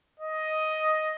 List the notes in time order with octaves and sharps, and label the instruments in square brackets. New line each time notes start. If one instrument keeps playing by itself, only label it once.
[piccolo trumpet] D#5